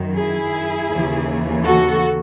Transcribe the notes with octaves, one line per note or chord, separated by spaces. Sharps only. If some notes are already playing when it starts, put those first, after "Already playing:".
Already playing: F#2 D#3
E4 G#4
D#2 C#3 E3
F#4 A4